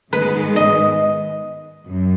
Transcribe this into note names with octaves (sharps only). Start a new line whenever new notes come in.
G#2 D#3 G#3 B3 B4
D#5
F#2